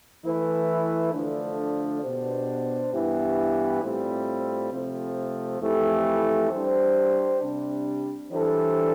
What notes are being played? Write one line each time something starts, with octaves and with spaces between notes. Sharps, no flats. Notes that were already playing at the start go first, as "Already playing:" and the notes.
E3 A3 E4 B4
D3 F3 A3 D4
B2 B3 D4 G4 C5
G2 E3 B3 E4 G4
A2 G3 C4 F4 C5
C3 F3 A3 C4
F2 E3 A3 E4 G4
G3 D4 G4 C5
C3 G3 D4
E3 G3 D4 A4 C5